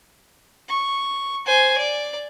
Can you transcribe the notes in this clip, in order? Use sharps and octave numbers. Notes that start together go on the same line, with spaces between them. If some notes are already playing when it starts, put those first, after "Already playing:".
C#6
C5 G#5
D5